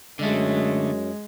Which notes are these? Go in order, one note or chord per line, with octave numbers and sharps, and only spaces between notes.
F#2 D3 G#3 A3